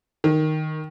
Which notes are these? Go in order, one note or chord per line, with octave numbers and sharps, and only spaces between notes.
D#3